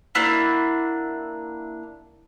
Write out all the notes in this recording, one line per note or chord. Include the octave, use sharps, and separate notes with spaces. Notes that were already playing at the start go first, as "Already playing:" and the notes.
A#3 D4 E4 F#4